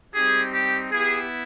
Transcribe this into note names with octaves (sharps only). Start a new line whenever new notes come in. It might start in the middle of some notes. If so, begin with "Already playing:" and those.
G3 C4 D#4 G4 G#4
G4
B3 E4 G4 G#4